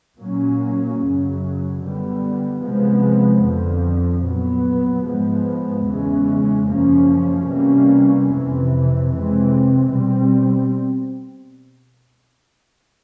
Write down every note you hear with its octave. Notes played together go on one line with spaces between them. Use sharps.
A#2 F#3 A#3 C#4
F#2 C#3 F#3
D3 G3 B3
C3 F3 G#3 B3
F2 D3 F3
A#2 F#3 B3
G#2 F3 G#3 B3
E2 C#3 E3 G#3 C#4
F#2 C#3 F3 A#3 C#4
C3 E3 G3 A#3 C#4
F2 C3 E3
C3 E3 G#3 C4
B2 G3 C4